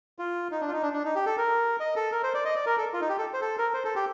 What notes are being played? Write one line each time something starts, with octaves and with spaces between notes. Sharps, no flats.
F4
D#4
D4
F4
D#4
D4
D4
D#4
G4
A4
A#4
D#5
A4
A#4
C5
D5
D#5
D5
A#4
A4
F4
D#4
G4
A4
C5
A4
A#4
C5
A4
G4